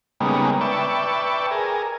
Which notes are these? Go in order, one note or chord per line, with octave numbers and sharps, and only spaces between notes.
C#3 G3 G#3 A#3 B3 D#4
B4 D5 E5 G5 A5 C#6
G#4 A#4